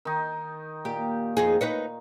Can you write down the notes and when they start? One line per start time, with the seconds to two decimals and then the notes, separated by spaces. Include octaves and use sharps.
0.05 D#3 D#4
0.85 A#2 G4
1.37 F2 D#4 G#4
1.61 D#4 B4 C#5